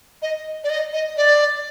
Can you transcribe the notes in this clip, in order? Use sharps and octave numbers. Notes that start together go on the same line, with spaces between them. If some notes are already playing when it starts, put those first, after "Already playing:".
D#5
D5
D#5
D#5
D5